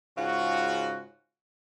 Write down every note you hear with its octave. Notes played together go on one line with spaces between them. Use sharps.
G#2 C#3 F4 F#4